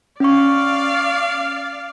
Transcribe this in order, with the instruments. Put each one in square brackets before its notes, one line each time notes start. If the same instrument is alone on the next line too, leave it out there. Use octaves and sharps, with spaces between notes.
[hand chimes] C#4 C#6 [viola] D5 F5